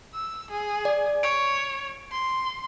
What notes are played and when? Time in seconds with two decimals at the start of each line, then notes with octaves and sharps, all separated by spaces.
0.14 E6
0.51 G#4
0.85 D5 G#5
1.23 C#5 D7
2.12 C6